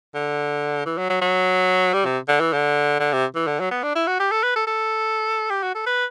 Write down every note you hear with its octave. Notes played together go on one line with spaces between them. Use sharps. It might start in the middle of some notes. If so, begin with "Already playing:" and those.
D3
E3
F#3
F#3
F#3
G3
C3
D3
E3
D3
D3
C3
E3
D3
F#3
B3
D4
E4
F#4
G4
A4
B4
A4
A4
G4
F#4
A4
B4